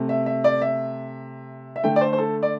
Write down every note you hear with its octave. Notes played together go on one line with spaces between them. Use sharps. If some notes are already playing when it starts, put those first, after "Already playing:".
Already playing: C3 A3
E5
E5
D5
E5
E5
D3 A3 G5
D5
C5
C5
A4
D5